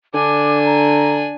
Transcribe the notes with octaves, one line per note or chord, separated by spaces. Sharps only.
D3 D4 G#5 D6
A#5